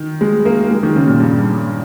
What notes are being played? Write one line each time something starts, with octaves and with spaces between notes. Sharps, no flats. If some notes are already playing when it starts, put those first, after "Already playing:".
Already playing: D#3
G#3
A#3
G#3
D#3
C#3
A#2
G2